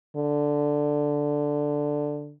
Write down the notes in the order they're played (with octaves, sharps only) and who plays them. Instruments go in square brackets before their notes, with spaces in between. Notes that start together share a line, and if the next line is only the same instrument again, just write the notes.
[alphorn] D3